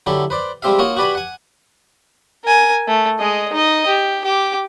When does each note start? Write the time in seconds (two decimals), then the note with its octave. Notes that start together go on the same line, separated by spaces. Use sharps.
0.06 D3 F#3 E4 G4 A4
0.30 B4 C5 D5
0.62 G3 G#3 C4 G4 E5 F5
0.79 A#3 D#4 F4 F#4 C#5 D#5
0.97 F#4 G4 B4 D5 G#5 B5
1.15 F#5 G#5
2.45 A#4 G#5
2.88 A3
3.20 G#3 D#5
3.53 D#4 D#5
3.87 G4
4.24 G4 D6